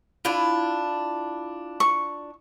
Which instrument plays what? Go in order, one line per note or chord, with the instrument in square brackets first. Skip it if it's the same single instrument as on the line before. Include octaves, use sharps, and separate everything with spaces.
[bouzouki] D4 E4 F4
[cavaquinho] C#6